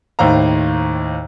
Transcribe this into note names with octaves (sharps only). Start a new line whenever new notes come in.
D#2 A2 C5 F5 A#5